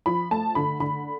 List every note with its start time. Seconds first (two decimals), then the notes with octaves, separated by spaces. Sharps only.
0.06 F3 B5
0.31 A3 A5
0.55 D3 B5
0.80 D3 B5